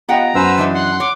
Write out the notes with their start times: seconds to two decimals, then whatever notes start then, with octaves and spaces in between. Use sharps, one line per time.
0.09 B3 F4 G4 D#5 F#5 G5 A#5
0.35 F#2 B4 C5 E6
0.58 E3 D4 D#4
0.75 F#5 C6 F#6
1.00 C#5 D6